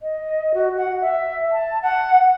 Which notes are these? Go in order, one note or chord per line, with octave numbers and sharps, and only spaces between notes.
D#5
F#4
F#5
E5
A5
F#5